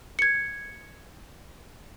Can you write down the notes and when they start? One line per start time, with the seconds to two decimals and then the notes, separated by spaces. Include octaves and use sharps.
0.19 G#6 C#7